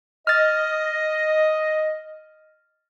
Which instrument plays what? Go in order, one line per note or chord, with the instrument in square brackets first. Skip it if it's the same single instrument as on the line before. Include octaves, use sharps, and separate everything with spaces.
[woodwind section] D#5 [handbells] F6 A6